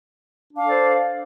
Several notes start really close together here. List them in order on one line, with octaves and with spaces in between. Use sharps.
D4 F5 A4 D5 C5